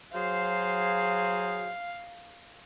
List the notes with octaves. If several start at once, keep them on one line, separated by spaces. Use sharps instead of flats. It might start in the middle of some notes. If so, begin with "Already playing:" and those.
F#3 G#4 C5 F5